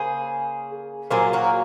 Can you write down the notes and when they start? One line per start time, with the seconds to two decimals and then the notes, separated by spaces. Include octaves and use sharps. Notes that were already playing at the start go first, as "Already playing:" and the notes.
Already playing: C#3 A#3 G#4 C5
1.11 A#2 F#3 A#3 G#4 C5
1.33 F#4 A#4